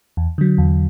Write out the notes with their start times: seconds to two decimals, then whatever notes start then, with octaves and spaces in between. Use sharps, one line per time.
0.17 E2
0.38 D3 F#3
0.58 E2